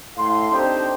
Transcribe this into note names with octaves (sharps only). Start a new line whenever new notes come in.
A2 F5 C6
C4 D4 D#4 G4 A4 C5